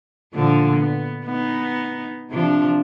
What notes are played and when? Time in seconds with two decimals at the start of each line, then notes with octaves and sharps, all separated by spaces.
0.33 A#2 D3 F3
0.76 B3
1.26 B3 D#4
2.31 C3 F3 D4